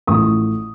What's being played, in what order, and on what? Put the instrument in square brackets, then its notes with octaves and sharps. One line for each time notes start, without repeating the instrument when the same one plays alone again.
[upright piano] A1 A2 F3 A3 C#6 D#6